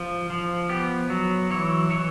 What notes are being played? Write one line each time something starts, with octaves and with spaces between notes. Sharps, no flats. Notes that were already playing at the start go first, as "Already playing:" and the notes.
Already playing: F3
F3
B3 G4
F#3
E3 C#5
E3 C#5